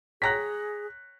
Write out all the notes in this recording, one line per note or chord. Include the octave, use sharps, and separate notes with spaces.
G#4 C#5 G5 A#5 F#6 A#6 B6